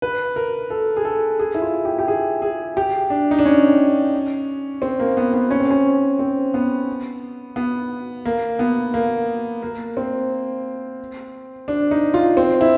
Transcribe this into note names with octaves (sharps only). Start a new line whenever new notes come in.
B4
A#4
A4
G#4
A4
G#4
E4
F4
G4
G4
G#4
G#4
G4
D4
D#4
D4
C#4
C4
A#3
B3
B3
C#4
C4
C#4
C4
B3
B3
A#3
B3
A#3
A#3
C4
D4
D#4
F4
C4
E4